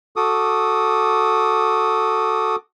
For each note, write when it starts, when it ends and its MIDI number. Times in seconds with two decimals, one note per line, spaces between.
0.16 2.56 66
0.16 2.56 69
0.16 2.56 86
0.16 2.56 87